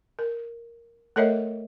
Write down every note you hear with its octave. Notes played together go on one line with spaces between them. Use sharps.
A#4
A3 A4 A#4 C#5 D#5 E5